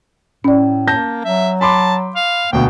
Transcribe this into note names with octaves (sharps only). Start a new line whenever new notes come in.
A2 C#4 D5
A#3 A5 G6 A#6
F#3 E5
A5 B5 C6 D6
F5
D2 B2 A#3 G5